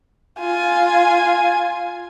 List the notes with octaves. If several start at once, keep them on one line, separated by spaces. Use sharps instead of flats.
F4 G#5